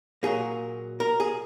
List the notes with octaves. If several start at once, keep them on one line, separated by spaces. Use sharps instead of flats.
A#2 F#3 A#3 G#4
A#4
G#4